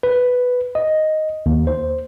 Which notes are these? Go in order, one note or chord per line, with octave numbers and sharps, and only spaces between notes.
B4
D#5
D#2
C5